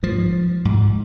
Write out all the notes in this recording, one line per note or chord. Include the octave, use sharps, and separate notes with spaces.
G#2 F3
G#2